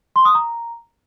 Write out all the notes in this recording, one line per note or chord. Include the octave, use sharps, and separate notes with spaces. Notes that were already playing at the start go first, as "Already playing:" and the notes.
C6
D#6
A#5